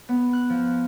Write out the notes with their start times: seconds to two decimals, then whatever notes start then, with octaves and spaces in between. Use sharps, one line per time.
0.09 B3
0.33 F#6
0.50 F3